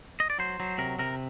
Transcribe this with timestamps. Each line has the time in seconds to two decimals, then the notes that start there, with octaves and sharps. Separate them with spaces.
0.20 D#5
0.30 D5
0.39 F#3 C5
0.60 F#3
0.78 C3 A#4
0.99 C3 A#4